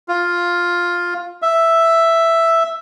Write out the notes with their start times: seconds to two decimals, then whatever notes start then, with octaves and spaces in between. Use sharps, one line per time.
0.08 F4
1.42 E5